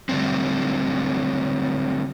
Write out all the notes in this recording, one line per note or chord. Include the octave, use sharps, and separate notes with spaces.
D3 F#3 G3 A3 C4